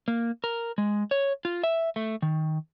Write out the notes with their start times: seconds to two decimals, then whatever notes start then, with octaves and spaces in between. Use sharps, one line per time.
0.08 A#3
0.44 A#4
0.78 G#3
1.11 C#5
1.45 F4
1.63 E5
1.96 A3
2.22 D#3